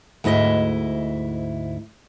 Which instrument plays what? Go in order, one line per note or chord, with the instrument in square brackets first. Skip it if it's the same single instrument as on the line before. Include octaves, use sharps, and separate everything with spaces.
[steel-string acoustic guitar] D2 G#2 E4 D#5 E5